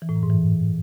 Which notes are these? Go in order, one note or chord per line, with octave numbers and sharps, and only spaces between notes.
E3
A2
F#2
G#2
E3